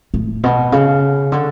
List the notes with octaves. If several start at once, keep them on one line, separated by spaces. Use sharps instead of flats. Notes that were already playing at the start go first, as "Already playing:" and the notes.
A2
B2
C#3
D3